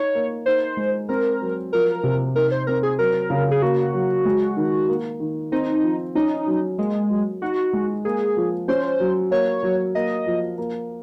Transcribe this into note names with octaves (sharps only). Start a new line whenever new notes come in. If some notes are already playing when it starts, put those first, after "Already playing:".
Already playing: D#4 C#5
A#3
D#4 C5
G#3
C4 A#4
F#3
F3 A#4
C3
D#4 A#4
C5
C4 A#4
G#4
F#3 A#4
C#3
G#4
A#3 F#4
F#3
G#3
D#3
A#3
D#3
C4 D#4
F3
C#4 D#4
F#3
G#3 A#3
F#3
D#4 F#4
G#3
A#3 G#4
F3
C#4 C5
F#3
A#3 C#5
F#3
A#3 D#5
F3
A#3